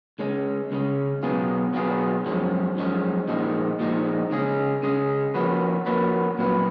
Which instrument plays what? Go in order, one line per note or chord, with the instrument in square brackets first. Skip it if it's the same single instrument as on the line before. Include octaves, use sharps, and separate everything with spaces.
[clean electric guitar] C#2 C#3 G#3 C#4
C#2 C#3 G#3 C#4
B2 F#3 B3 F4 G#4
B2 F#3 B3 F4 G#4
F#2 F3 G#3 C#4
F#2 F3 G#3 C#4
A#2 F3 G#3 D#4
A#2 F3 G#3 D#4
C#3 G#3 C#4 G#4
C#3 G#3 C#4 G#4
F3 A#3 C#4 F#4 B4
F3 A#3 C#4 F#4 B4
A#2 F#3 B3 F4 B4